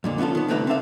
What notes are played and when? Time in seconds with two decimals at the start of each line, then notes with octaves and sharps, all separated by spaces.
0.04 F2 A#2 D3
0.18 B3 C#4 E4 F4 A4
0.35 D#3 B3
0.48 C2 D3 D#3 A3 B4 A#5
0.67 C4 D4 A4 E5 F5